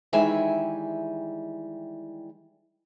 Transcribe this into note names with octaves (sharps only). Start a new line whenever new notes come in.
D#3 E3 G3 G#3 E5 G#5